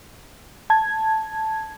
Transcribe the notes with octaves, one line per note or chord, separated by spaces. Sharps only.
A5 G#6